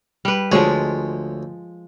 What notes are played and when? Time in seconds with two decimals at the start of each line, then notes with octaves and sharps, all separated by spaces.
0.25 G3 B4
0.52 D2 F3 G#3 C#5